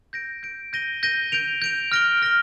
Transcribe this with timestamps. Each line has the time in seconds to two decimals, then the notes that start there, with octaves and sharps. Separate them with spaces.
0.13 G6 A#6 D7
0.43 G6 A#6 D7
0.73 G6 A#6 D#7 G7
1.03 G6 A#6 D#7 G7
1.32 G6 D7 F7
1.62 G6 D7 F7
1.92 F6 A#6 D7 G7
2.22 F6 A#6 D7 G7